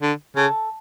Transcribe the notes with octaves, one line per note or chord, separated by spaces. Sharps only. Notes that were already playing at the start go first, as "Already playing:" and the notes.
D3
C#3 A4